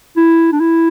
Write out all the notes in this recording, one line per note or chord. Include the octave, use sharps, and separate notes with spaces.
E4
D4
E4